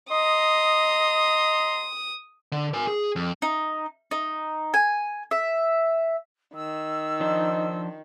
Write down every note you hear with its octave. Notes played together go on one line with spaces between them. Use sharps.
D#5 A#5 C6 D#6
D3
A#4 G#5
G#4
F2
D#4
D#4
G#5
E5
D#3 E6
F3 D4 D#4 C5